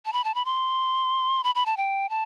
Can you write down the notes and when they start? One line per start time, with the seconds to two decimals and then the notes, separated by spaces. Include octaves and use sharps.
0.05 A5
0.13 B5
0.24 A5
0.35 B5
0.45 C6
1.44 B5
1.55 B5
1.66 A5
1.77 G5
2.10 A5